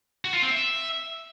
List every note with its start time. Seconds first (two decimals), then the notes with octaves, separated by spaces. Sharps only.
0.25 F#4
0.34 F4
0.42 C4
0.51 E5